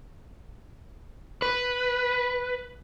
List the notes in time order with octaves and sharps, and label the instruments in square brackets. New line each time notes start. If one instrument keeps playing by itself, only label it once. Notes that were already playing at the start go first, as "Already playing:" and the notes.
[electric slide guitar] B4